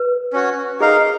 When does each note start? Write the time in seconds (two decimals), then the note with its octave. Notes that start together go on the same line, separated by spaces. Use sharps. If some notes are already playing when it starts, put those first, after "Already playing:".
Already playing: B4
0.33 C#4 F#4 C#5
0.80 D#4 G#4 A#4 F5